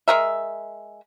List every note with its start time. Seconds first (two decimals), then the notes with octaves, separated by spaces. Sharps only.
0.08 G#3 A#4 E5